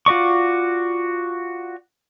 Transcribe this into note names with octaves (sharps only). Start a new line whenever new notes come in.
F4 F#4 D5 C#6